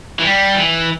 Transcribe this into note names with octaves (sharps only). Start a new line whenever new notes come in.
E3
G3
E3